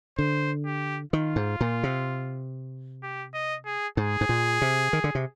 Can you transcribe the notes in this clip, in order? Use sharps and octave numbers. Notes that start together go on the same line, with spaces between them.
D3 C5
G4
D#3 F4
G#2
A#2
C3
G4
D#5
G#4
G#2 G#4
G#2
A#2
C3
D#3
D3
C3